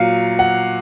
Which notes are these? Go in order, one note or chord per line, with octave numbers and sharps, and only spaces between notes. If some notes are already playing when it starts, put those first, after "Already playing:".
Already playing: A#2 F#3 F5
F#5